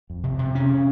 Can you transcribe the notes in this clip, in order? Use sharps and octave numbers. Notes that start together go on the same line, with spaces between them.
F2
C3
C3
C#3 C#4